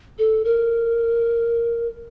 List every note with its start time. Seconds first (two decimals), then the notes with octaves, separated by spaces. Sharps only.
0.19 A4
0.45 A#4